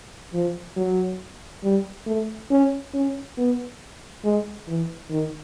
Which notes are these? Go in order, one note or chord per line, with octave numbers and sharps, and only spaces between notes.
F3
F#3
G3
A3
C#4
C#4
B3
G#3
E3
D#3